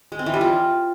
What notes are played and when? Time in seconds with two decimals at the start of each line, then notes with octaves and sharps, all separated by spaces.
0.12 G#3
0.19 C4
0.26 E3
0.34 G3
0.41 F4